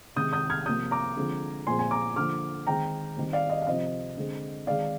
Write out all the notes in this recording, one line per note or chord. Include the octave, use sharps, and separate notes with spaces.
C3 D#3 G#3 D#6 G6
D#6 G6
F6 G#6
C3 F3 A#3 D#6 G6
A#5 D6
D3 F3 G#3 C4
A#2 F3 G#3 C4 G#5 C6
G#5 C6
A#5 D6
D3 F3 A#3 D6 F6
D#3 G#3 C4 G5 A#5
D#3 G3 C4
D5 F5
D#5
F5
C3 F3 C4 D#5
D3 G#3 C4
D#3 G#3 C4 D5 F5